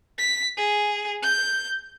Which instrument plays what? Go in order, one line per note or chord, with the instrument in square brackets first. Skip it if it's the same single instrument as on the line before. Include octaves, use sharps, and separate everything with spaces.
[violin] B6
G#4
G6